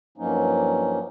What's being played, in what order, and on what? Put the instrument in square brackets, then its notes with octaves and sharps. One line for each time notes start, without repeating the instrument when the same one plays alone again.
[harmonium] G2 F3 F#3 A#3 C#4 D#4